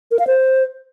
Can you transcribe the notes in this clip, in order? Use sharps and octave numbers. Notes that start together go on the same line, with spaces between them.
A#4
F5
C5